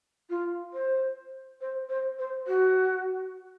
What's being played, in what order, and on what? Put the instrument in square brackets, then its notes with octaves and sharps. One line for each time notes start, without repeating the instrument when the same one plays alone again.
[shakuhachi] F4
C5
C5
C5
C5
F#4